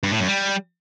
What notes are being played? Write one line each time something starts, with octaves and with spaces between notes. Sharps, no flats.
G2
A2
F#2
G3